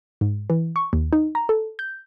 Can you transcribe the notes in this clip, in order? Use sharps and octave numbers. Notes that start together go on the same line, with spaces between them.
G#2
E3
C#6
D#2
D#4
A#5
A4
G6